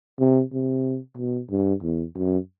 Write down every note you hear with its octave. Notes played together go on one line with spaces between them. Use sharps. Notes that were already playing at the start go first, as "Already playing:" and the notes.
C3
C3
B2
G2
E2
F#2